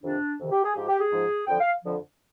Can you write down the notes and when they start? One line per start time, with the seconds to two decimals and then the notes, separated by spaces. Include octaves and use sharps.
0.03 F2 C3 D#3 D4
0.40 F2 C3 D#3
0.51 G4
0.64 G#4
0.75 G#2 F3 G4
0.88 G4
1.00 G#4
1.12 G#2 F3
1.47 F2 D3 F3 G5
1.60 F5
1.83 F2 D3 F3